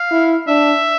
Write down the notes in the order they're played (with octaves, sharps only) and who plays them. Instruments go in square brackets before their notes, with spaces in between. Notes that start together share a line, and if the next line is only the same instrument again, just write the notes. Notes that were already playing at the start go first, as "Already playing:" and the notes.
Already playing: [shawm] F5
[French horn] E4
[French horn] D4 [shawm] E5